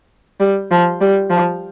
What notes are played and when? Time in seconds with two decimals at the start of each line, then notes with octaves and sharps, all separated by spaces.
0.40 G3
0.71 F3
1.01 G3
1.30 F3